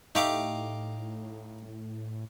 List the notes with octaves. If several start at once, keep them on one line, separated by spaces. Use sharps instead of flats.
A2 A3 D#4 G4 F5 D6